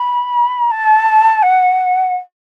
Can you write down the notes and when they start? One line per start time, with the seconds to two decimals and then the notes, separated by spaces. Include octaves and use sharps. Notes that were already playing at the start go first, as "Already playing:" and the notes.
Already playing: B5
0.71 A5
1.43 F#5